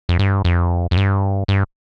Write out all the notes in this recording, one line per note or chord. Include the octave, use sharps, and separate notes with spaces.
F2
G2
F2
F2
G2
G2